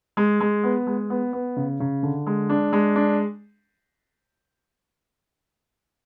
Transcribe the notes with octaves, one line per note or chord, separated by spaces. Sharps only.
G#3
G#3
B3
G#3
B3
B3
C#3
C#3
D3
G#3
D4
G#3
D4